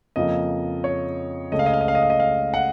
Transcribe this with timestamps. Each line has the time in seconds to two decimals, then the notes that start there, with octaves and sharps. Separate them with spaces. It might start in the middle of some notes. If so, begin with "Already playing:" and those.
0.16 F2 C#3 F3 A#3 D#5
0.84 C#5
1.52 C#2 C#3 A3 D#5
1.59 F5
1.66 D#5
1.74 F5
1.81 D#5
1.88 F5
1.95 D#5
2.03 F5
2.10 D#5
2.20 F5
2.54 F#5